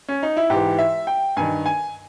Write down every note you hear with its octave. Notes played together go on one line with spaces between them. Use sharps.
C#4
D#4
E4
G#2 E3 G4
E5
G5
G2 D#3 G#5
G#5